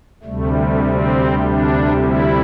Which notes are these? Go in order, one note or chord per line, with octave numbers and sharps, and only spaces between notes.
D2 C3 G3 A3
A3
C4
D4
E4